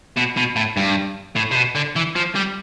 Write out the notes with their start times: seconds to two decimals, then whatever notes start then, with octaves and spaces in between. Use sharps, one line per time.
0.17 B2
0.37 B2
0.56 A2
0.77 G2
1.36 A2
1.51 C3
1.56 B2
1.75 D3
1.96 E3
2.16 F3
2.35 G3